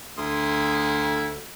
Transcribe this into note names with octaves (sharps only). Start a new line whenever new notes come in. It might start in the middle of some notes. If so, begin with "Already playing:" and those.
D2 E4 C6 D#6